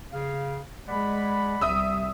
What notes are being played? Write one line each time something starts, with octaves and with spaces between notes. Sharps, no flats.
C#3 F5
G#3 D5 F#5 B5
C2 G3 E5 D#6 E6